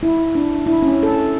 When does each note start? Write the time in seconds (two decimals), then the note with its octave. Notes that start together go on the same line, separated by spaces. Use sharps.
0.03 E4
0.35 D4
0.66 E4
0.82 C#4
1.03 A4